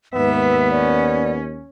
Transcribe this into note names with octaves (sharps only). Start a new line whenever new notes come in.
D#2 G#2 B3 B4 E5
C#4 D5